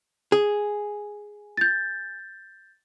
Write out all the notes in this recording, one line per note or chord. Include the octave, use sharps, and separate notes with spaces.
G#4
G6 A6